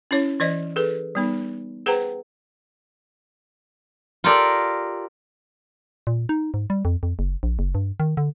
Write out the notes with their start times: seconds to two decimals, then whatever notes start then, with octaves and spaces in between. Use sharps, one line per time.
0.11 C#4 E4 C#5
0.40 E3 C5 D5 D#5
0.76 G#4 A4 B4
1.15 G3 B3 D#4
1.86 G#4 B4 C5 F#5 G5 A#5
4.24 F4 G4 A4 A#4 D5
6.07 A#2
6.29 D#4
6.54 G#2
6.70 G3
6.85 F2
7.03 F2
7.19 F#1
7.43 A#1
7.59 F#1
7.75 G2
8.00 D#3
8.17 D3